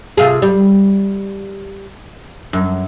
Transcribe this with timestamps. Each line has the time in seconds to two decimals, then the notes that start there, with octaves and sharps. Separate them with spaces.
0.17 C3 F4 G#4
0.42 G3
2.53 F#2